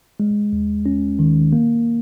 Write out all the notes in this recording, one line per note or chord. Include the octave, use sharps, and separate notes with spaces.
G#3
D#2
C#4
D#3
A#3